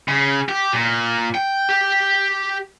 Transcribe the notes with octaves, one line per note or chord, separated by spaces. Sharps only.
C#3
G4
A#2
G5
G4